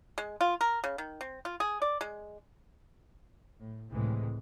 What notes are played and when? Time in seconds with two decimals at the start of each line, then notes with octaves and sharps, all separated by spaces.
0.18 G#3
0.41 F4
0.61 A#4
0.84 C#3
0.98 D#3
1.21 C4
1.45 F4
1.60 G#4
1.82 D5
2.01 G#3
3.60 A2
3.91 C#2 A2 C3 E3 G#3